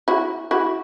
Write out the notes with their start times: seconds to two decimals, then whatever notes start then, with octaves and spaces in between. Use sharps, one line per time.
0.08 E4 F#4
0.51 E4 F#4